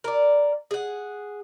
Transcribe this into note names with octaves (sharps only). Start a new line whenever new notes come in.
A#4 D5
G#4 F#5